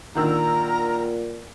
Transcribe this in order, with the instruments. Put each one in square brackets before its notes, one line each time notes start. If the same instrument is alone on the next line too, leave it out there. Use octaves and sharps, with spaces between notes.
[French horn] A#2 [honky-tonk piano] D3 D#3 E6 [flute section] A#4 A#5